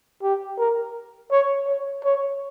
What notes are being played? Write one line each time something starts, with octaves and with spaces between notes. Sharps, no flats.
G4
A#4
C#5
C#5
C#5